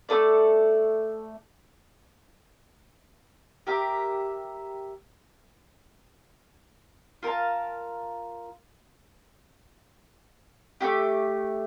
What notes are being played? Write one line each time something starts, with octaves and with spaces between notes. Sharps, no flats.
A3 D4 A4 D5
G4 A#4 E5
F4 A#4 F5 A5
A3 D4 G4